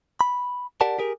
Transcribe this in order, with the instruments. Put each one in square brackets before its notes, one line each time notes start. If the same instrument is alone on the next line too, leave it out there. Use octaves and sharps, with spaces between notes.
[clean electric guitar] B5
G4 A#4 D5 F#5 A5
G4 G#4 A#4